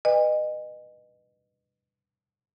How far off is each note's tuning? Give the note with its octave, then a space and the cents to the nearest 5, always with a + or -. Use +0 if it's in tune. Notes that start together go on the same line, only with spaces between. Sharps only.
B4 +0 D#5 -25 G#5 -40